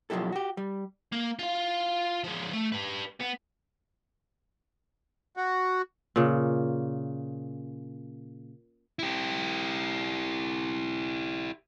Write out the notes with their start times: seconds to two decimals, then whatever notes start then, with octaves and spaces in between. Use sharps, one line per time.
0.10 B2 F3 F#3 E4 G4 A4
0.32 F#4 G4
0.57 G3
1.12 A#3
1.39 F4 F5
2.24 F3 G#3
2.53 A3
2.72 G4 B4
3.21 B3
5.37 F#4
6.16 A#2 C#3
8.99 E4 G4